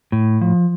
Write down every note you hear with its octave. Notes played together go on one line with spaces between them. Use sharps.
A2
F3